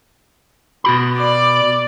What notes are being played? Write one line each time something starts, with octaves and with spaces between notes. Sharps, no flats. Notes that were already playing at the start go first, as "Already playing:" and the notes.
B2 F#4 B5
D5